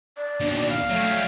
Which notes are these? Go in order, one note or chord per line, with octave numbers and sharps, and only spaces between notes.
D5
D#2 B2 D4
F5
F#3 G3 A3 C#5